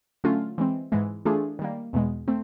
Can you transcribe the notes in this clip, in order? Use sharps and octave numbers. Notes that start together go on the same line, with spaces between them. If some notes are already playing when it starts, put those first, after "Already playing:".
D3 F#3 A3 C#4 F4
E3 G#3 C4
G#2 E3 G#3
E3 A3 D4 F4 G#4
D#3 G3 A#3
E2 B2 G#3
A3 C4